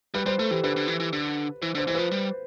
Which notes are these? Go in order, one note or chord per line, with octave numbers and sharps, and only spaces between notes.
G3 B4
G3 C5
A3 A4
E3 G4
D3 B4
D3
E3
E3
D3
E3 C5
D3 C5
E3 C5
F3 B4
G3